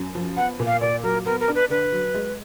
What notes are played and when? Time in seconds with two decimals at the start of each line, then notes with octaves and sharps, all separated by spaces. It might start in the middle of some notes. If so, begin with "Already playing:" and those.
Already playing: F#2
0.15 F3
0.37 B3 F#5
0.59 A#2
0.66 F5
0.81 A#2 D5
1.03 F#3 A#4
1.25 B3 A#4
1.40 A#4
1.48 D4
1.55 B4
1.69 D3 B4
1.92 F#3
2.14 G#3